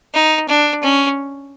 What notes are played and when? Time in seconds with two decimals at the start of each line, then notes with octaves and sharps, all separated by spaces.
0.14 D#4
0.49 D4
0.83 C#4